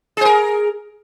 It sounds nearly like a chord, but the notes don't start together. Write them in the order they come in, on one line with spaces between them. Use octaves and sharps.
G#4 C5 A#4